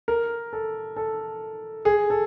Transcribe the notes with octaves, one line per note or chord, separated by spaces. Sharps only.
A#4
A4
A4
G#4
A4